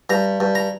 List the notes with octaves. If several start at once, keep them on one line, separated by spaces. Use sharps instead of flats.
G2 A#5
G2
A#5